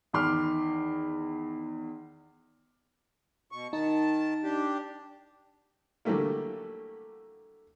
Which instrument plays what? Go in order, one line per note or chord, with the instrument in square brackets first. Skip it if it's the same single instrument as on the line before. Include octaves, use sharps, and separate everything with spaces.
[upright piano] E2 D#3 B5 C6 D6 F6
[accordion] B2 C#6
[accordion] D#3 A5 [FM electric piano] D#4
[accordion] D4 G4
[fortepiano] D3 E3 F#3 G3 A3 A#3